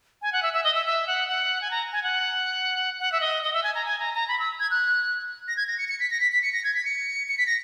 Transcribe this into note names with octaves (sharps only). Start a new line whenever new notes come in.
G#5
F#5
E5
E5
D#5
E5
E5
F#5
F#5
G#5
A#5
G#5
F#5
F#5
E5
D#5
D#5
E5
G#5
A#5
G#5
A#5
A#5
B5
E6
G#6
F#6
A#6
G#6
A#6
C#7
C#7
B6
A#6
B6
B6
C#7
A#6
G#6
B6
C#7
C#7
B6
A#6